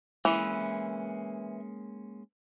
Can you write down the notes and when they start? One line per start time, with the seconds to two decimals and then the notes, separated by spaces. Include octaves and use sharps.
0.25 E3 G#3 A#3 C#4